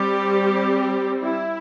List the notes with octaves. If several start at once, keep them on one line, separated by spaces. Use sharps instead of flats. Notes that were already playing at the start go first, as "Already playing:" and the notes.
Already playing: G3 C4 G4
E4